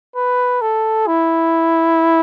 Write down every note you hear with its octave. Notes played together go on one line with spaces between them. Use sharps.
B4
A4
E4